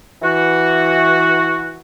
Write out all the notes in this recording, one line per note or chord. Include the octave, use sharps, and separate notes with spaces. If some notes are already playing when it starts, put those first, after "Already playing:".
E3 F#4